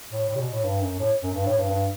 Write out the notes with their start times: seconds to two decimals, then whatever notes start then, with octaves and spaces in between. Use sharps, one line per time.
0.11 A2
0.29 A2
0.35 C3
0.41 B2
0.52 A2
0.64 G2
0.81 F#2
0.99 A2
1.23 F#2
1.34 G2
1.46 A2
1.58 G2
1.69 G2